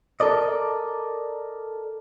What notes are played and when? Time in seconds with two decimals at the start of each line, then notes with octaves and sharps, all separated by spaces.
0.20 A4 A#4 D5 D#5